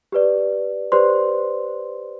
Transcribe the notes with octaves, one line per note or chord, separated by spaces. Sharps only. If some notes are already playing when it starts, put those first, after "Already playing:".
G4 B4 D5
G4 B4 C5 D5 C6